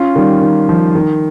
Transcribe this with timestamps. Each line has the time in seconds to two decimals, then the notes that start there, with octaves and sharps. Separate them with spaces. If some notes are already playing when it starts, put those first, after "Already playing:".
Already playing: C#4 F4
0.16 D#3 G3
0.41 D#3
0.69 F3
0.95 D#3